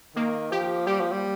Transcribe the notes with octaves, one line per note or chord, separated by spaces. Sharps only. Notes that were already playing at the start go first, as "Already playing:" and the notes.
D#3 A#3
F3 G4
G3 G4
F3
G3